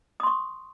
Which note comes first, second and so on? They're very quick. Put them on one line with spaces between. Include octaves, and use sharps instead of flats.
D#6 C6 C#6